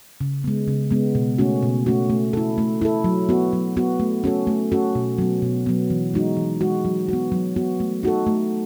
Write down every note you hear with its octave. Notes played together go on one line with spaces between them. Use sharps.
C#3
G#3 B3
C#3
G#3 B3
B2
A3 C#4 F#4
B2
A3 C#4 F#4
A3
E4 A4
A3
E4 A4
F#3
B3 F#4
F#3
B3 F#4
A3
C#4 F#4 A4
A3
C#4 F#4 A4
B2
F#3 B3
B2
F#3 B3
E3
G#3 D#4 F#4
E3
G#3 D#4 F#4
F#3
B3 F#4
F#3
B3 F#4
A3
D#4 F#4 A4
A3